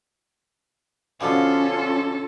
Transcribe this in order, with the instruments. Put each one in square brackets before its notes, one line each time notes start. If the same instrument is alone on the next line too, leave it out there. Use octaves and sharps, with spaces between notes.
[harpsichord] B2 D3 F3 [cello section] C#4 F4 [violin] A4 [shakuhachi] F5